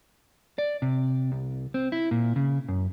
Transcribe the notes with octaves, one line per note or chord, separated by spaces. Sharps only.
D5
C3
C2
C4
E4
A#2
C#3
F#2